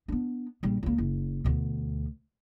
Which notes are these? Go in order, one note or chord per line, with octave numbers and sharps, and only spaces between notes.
B3 D4
A#1 G3
C#2 A#3
F#1
D2 B2